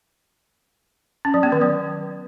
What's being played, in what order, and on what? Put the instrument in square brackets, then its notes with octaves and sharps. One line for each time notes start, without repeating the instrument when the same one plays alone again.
[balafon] C#4
F#3
B3
D#3
F#3